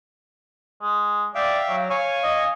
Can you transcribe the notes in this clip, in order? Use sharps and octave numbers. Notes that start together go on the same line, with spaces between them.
G#3
D5 E5 F5 G5
F#3
C#5 F5 G#5 C#6
D#5